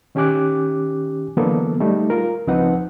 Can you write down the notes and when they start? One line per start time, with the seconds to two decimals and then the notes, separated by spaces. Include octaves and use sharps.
0.15 D#3 C#4 G4 G#5 D6 F#6
1.37 D3 E3 F#3 A#3 B3 A4
1.80 G3 A3 D#4
2.10 F4 A#4
2.47 C#2 F3 C4 D#4 B4 F#5